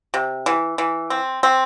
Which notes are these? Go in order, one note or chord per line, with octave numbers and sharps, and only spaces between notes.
C3
E3
E3
C4
C4